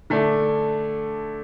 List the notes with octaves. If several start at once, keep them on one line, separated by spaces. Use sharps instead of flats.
D3 A3 D4